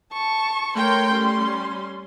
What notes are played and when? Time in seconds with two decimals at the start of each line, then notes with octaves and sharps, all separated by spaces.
0.13 A5 C#6
0.76 A3 A#4 C#5 G5 C6
1.14 G3 C#4